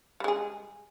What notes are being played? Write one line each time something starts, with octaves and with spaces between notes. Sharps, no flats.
G3 G#3 G#4